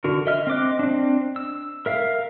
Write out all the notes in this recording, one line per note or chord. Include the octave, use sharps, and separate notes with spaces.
D3 F#4 A#4
D#5 E5 F6
C4 D#5 D6 F#6
C4 D4
E6
A#4 E5 F5